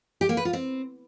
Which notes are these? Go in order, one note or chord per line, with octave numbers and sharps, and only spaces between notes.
G4
A#3
B4
F4
C4